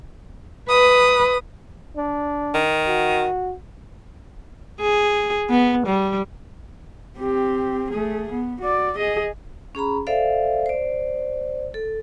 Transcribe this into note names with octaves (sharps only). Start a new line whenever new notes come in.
B4 D#6
D4
D#3
F#4
G#4
B3
G3
C4 G4
A3 G#4
B3
F#4 D5
G#4 D#5
C#4 G#4 A#5 B5
A4 C5 D5 E5 F5
C5 D5
A4